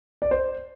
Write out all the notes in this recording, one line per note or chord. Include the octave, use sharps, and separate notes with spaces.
D5
C5